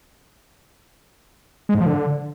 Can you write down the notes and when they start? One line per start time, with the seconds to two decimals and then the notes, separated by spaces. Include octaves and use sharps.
1.69 G#3
1.75 G#2
1.81 F3
1.86 D3